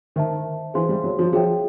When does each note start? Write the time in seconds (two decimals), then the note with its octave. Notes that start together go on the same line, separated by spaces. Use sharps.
0.16 D#3 C5 E5 A5
0.74 E3 G#4 C5 F5 G#5 C6
0.89 G3
1.04 F#3
1.19 F3
1.33 F3 G#4 C#5 E5 G5